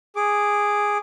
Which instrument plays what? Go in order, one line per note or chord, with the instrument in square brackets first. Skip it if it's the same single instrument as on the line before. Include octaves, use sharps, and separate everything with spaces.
[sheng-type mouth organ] G#4 D6